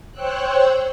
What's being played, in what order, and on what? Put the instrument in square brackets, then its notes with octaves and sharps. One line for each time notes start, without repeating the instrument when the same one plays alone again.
[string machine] C5 C#5 G5 E6 F#6